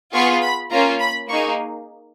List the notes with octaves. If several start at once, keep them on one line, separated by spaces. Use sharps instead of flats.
B3 F4 G#4 C#6
B5
A#3 C#4 F4 A#5
B5
A#3 D#4 G#4 C#6